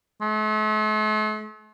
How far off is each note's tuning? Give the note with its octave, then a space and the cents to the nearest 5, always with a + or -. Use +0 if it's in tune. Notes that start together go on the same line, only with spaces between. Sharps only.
A3 -45